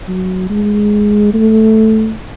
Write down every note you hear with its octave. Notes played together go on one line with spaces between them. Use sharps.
F#3
G#3
A3